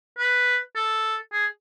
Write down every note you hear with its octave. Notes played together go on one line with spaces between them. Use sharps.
B4
A4
G#4